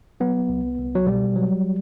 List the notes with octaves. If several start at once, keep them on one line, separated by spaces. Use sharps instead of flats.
F#3 B3
C2
C2
F#3
B2 G3
F#3